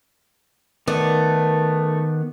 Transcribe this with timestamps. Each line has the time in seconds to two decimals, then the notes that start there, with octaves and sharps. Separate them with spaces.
0.88 D#3 A3 B3 D5